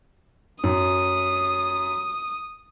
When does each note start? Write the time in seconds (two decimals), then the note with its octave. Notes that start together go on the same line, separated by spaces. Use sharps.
0.64 F#2 D#6